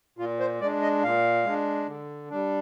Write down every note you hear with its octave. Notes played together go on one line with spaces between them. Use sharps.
A#2 F4
C5
G#3 D4 D5
D#5
A#2 F5
G#3 D4
D3
G3 D4